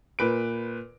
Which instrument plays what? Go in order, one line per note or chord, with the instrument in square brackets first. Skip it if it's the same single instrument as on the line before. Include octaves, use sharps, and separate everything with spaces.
[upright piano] A#2 B4 D7